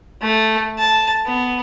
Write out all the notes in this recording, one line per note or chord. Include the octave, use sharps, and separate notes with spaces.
A3
A5
B3